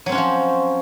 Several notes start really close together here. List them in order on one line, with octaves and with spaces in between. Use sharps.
F#3 C4 C#4 F#4 F3